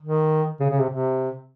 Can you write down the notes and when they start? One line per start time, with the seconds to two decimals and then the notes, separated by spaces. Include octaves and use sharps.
0.02 D#3
0.60 C#3
0.70 C#3
0.79 C3
0.89 C3